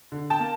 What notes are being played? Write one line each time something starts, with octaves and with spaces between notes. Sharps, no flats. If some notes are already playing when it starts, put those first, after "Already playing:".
D3
G5 A5
A#3